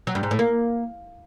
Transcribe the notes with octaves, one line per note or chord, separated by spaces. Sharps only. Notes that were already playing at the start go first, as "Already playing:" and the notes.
F#3
G2
G#2
A2
A#3